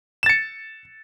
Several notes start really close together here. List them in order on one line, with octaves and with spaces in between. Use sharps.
E7 A6 C#7